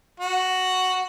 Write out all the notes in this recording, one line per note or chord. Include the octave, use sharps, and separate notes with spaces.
F#4